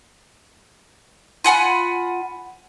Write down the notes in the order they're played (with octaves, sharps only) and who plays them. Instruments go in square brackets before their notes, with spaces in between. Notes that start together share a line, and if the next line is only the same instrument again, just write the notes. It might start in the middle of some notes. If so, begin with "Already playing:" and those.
[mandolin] F4 F#5 G#5 B5